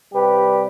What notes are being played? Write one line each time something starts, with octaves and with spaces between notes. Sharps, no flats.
C3 G3 G4 B4